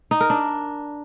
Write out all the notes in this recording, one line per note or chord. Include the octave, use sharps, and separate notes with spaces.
D#4
A#4
D4